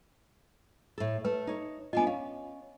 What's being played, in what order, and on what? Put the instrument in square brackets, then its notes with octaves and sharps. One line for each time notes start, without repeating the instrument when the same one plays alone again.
[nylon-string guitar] A2 A4
[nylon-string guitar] A3 [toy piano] B4
[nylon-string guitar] D#4 C#5
[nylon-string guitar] B3 D4 F4 [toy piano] D#5 G#5
[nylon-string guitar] C#4 [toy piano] F5